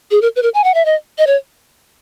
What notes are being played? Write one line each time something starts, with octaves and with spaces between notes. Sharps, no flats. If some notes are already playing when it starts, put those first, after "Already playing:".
G#4
A#4
B4
A#4
G#5
F#5
E5
D#5
D#5
C#5